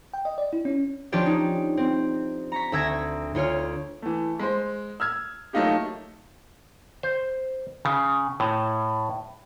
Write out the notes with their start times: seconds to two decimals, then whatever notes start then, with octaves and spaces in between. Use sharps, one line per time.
0.14 G5
0.25 D#5
0.38 D5
0.53 E4
0.65 C#4
1.12 F3 C#4 D4 F4 G4 D5
1.26 D#4
1.77 C4
2.52 A#5 C#6 B6
2.72 D2 E5 E6 G#6 A#6
3.35 D2 F4 C#5 F6
4.02 E3 A3
4.40 G#3 C5
5.00 E6 F6 G#6
5.53 F#3 A3 A#3 D#4 F4 G4
7.03 C5
7.85 C#3
8.40 A2